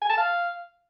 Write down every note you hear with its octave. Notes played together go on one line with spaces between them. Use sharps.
G#5
A5
F5